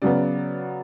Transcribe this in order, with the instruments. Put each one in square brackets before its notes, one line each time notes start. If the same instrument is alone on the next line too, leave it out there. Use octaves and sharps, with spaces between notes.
[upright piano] C#3 F#3 B3 D5